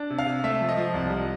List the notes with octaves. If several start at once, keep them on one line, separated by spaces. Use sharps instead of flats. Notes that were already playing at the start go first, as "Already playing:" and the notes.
Already playing: D4
C3
F5
C3
A3 E5
F3
D#5
F3
C2
G3